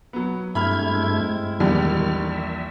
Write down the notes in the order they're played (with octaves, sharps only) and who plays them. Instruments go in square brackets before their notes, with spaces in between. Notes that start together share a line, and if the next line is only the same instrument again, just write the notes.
[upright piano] F#3 B3
[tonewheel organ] G2 A3 G#6 [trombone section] G#3 C4 E4 [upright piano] B5 F6
[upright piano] A#1 E2 G3 [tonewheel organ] D#3 F6
[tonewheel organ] E5